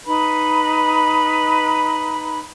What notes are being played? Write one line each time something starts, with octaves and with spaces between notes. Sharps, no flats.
D#4 B4 B5